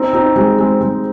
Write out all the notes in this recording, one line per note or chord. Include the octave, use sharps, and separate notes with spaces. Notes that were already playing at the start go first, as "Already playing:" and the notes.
Already playing: C4 D#4
C4 D#4
G#3 C4
G#3 C4
G#3 C4